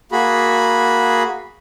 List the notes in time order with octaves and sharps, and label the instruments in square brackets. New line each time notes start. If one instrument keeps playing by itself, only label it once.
[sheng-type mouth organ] A#3 F#4 G#4 B5